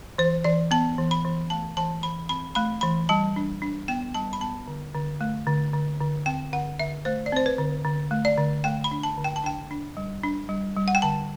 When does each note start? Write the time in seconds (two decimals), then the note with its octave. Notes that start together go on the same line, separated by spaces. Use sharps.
0.18 E3 C5
0.44 E3 D5
0.71 B3 A5
0.98 E3
1.11 B5
1.25 E3
1.50 A3 A5
1.77 E3 A5
2.03 E3 B5
2.29 C4 B5
2.55 A3 B5
2.81 E3 B5
3.09 G3 A5
3.36 D4
3.62 D4
3.88 B3 G5
4.14 G3 A5
4.33 B5
4.41 B3 A5
4.67 D3
4.94 D3
5.21 A3
5.47 D3
5.73 D3
6.01 D3
6.26 C4 G5
6.53 D3 F#5
6.80 D3 E5
7.05 A3 C5
7.26 D5
7.32 C4 C5
7.46 B4
7.58 D3
7.85 D3
8.11 A3
8.25 D5
8.38 D3
8.64 A3 G5
8.84 B5
8.91 D4
9.03 A5
9.17 D3
9.24 G5
9.36 A5
9.44 D4 G5
9.71 D4
9.97 G3
10.24 D4
10.49 G3
10.76 G3
10.88 F#5
10.95 G5
11.02 D3 A5